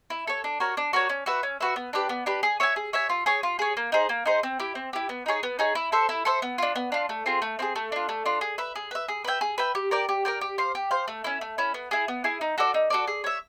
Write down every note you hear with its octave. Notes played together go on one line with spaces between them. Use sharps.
E4
A4 C#5
D4
F#4 A#4 C#5
D4
F#4 A#4 C#5
C#4
F#4 B4 E5
C#4
F#4 B4 E5
B3
D4 G4 B4
B3
D4 G4 B4
G#4
C#5 E5 G#5
G#4
C#5 E5 G#5
F4
G#4 C#5
F4
G#4 C#5
A#3
D#4 G#4 C5
A#3
D#4 G#4 C5
C4
E4 G4
C4
E4 G4
B3
D#4 G#4 C#5
B3
D#4 G#4 C#5
E4
A4 C5 E5
E4
A4 C5 E5
B3
D4 F4
B3
D4 F4
A3
C4 F4 G#4
A3
C4 F4 G#4
A3
D4 F4
A3
D4 F4
G#4
B4 E5
G#4
B4 E5
G#4
B4 E5 G5
G#4
B4 E5 G5
G4
A#4 D5 G5
G4
A#4 D5 G5
G4
C5 F5
G4
C5 F5
A3
C#4 E4
A3
C#4 E4
B3
E4 G#4
B3
E4 G#4
D#4
F#4 A4 D5
D#4
F#4 A4 D5
G#4
C#5 E5